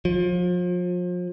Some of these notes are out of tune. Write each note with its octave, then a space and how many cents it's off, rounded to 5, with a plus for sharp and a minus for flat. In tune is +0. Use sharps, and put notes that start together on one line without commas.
F3 +35